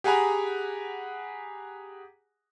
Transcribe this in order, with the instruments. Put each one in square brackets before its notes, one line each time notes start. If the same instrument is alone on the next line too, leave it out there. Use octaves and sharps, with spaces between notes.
[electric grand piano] G4 G#4 F#5 G#5 A#5 B5